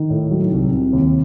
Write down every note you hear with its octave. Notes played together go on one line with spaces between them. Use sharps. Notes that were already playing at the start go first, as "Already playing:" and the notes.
Already playing: D#3
A2
F#3
C2
C3
D#2